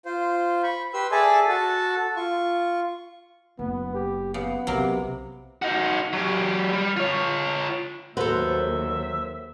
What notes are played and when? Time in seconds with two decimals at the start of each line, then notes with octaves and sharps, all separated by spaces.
0.05 F4 C5
0.63 B5 C#6
0.94 G4 B4 C6 E6
1.11 G#4 A4 D5 E5 G#5 A5
1.48 F#4 A4 A5
2.16 F4 C#6
3.59 F#1 B3
3.94 G4
4.34 C#3 B3
4.67 B1 C3 F#3 A#3
5.62 D#4 F#4
6.13 F#3 G4
6.73 G3
6.97 F4 C#5
8.17 D#2 F#3 A4 B4 C5 E5